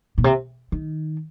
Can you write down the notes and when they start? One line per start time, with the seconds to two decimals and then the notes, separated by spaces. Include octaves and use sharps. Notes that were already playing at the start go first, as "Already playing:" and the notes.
0.18 A#2
0.24 C3
0.72 D#3